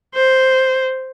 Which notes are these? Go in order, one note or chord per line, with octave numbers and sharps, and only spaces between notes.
C5